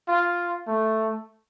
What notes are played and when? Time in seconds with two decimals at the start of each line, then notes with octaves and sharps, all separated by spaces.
0.08 F4
0.67 A3